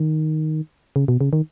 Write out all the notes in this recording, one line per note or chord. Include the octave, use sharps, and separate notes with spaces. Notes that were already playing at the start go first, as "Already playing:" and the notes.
Already playing: D#3
C#3
B2
C#3
D#3